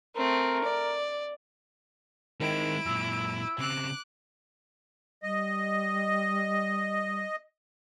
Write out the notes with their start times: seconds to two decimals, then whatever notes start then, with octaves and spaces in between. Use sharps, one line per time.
0.16 A3 C4 A#4
0.64 D5
2.40 D#3 G#3 C4 E4 D7
2.86 F#2 A#2 E6
3.59 C#3 C4 D6 F#6
5.23 G3 D#5